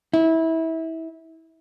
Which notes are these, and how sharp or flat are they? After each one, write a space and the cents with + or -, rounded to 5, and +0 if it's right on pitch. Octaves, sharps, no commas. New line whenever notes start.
E4 -25